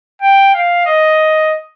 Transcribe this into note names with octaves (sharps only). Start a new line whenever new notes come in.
G5
F5
D#5